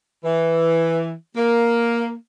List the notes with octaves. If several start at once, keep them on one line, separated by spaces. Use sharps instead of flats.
E3
A#3